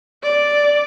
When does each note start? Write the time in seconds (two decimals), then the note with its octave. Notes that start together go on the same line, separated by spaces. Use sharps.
0.23 D5